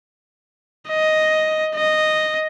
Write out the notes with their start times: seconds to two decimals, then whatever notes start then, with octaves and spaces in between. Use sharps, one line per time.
0.89 D#5
1.75 D#5